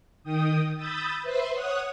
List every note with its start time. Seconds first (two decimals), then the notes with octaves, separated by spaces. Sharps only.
0.23 D#3 G5 D#6
0.76 B5 D#6 E6 G6 A6
1.22 B4 C5 E5 C6
1.53 C#5 F#5 D#6 F#6